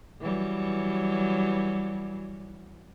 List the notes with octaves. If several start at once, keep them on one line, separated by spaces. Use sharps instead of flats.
E3 F#3 G3